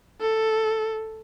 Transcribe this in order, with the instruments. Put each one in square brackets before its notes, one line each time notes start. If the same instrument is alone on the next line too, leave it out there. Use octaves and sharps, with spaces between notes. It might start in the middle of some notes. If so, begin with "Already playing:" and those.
[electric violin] A4